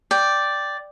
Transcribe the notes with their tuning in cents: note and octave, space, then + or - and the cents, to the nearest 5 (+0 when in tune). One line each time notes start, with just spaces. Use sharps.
D5 +0 G5 +0